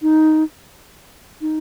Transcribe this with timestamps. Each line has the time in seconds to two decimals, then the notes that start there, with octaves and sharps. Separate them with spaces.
0.02 D#4
1.41 D#4